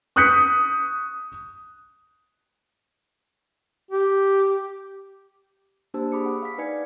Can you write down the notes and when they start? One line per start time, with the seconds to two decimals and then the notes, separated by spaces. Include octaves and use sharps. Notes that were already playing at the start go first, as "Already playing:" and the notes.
0.16 C#6 D#6 F#6 G6 B6 C#7
3.91 G4
5.94 A#3 D4 G4 C5 A5 E6
6.12 G#4 B5 D6 D#6 C#7
6.26 F#5
6.42 F5 B6
6.58 D#4 B4 D5 G#5 G#6 C#7